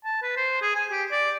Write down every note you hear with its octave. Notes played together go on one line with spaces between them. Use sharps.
A5
B4
C5
G#4
G#5
G4
D5